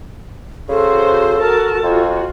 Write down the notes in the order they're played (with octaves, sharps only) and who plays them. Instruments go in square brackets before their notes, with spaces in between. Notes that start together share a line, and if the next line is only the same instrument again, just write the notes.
[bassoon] C#3 [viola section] F#4 C5 [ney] A4
[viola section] F#4 A#4 A5
[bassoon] F2 [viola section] F4 F#4